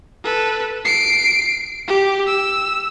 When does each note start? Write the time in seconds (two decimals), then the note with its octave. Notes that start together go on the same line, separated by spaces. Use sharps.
0.24 A4 B4
0.85 C7 D7
1.88 G4
2.27 E6